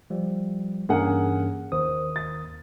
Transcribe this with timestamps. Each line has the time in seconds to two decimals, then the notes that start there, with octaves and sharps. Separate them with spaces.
0.10 F3 G3
0.89 G2 E3 A#3 C#4 G#4 F#5
1.72 D#2 D#3 C5 D#6
2.16 A6